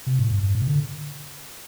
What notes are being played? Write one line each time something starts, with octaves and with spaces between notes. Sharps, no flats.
C3
A2
G2
G2
A2
C3
D3